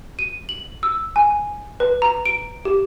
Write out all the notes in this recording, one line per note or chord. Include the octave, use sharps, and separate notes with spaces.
D#7
F#7
E6
G#5
B4
A#5
D7
G4